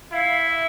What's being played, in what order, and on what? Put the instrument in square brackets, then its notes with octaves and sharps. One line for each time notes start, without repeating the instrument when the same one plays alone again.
[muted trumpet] E4 [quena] F5
[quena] E5